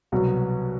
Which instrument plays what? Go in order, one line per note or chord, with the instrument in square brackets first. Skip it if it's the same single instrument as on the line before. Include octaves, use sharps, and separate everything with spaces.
[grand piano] C2 B2 F#3 B3